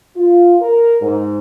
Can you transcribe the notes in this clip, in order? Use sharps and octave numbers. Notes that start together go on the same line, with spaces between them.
F4
A#4
G#2